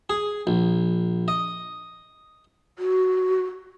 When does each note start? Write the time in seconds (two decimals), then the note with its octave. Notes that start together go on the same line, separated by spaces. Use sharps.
0.10 G#4
0.47 A#1
1.28 D#5
2.79 F#4